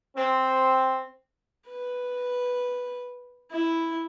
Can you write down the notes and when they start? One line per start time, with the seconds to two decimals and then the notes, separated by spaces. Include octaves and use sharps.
0.17 C4
1.67 B4
3.51 E4